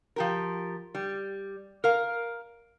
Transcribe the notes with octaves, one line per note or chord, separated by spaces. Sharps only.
F3 G4 A#4
G3
A#4 F5